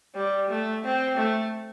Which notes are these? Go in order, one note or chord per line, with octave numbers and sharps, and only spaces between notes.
G3
A3
C4
A3